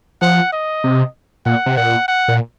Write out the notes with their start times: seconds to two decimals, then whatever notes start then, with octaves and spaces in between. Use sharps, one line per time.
0.21 F3 F#5
0.53 D#5
0.84 C3
1.46 A#2 F#5
1.66 C3
1.77 A#2 F#5
2.08 F#5
2.28 A#2